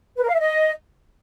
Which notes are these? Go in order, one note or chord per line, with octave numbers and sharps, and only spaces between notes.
B4
A#4
F5
E5
D#5